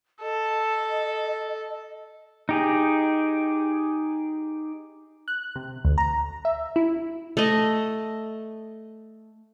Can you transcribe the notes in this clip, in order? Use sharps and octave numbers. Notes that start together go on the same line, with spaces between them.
A4 D#5
D#4 G4 G#4
F#6
C3
D2
A#5
E5
E4
A3 D#5